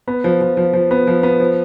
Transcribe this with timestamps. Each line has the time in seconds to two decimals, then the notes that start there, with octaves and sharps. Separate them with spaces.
0.08 B3
0.24 F3
0.41 F3
0.57 F3
0.73 F3
0.91 B3
1.07 F3
1.23 B3
1.40 F3